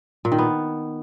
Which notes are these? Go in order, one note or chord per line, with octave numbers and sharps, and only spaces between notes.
A#2
D#3
B3